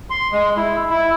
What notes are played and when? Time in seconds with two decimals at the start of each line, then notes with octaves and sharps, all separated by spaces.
0.10 C6
0.32 G#3
0.57 E4
0.90 E4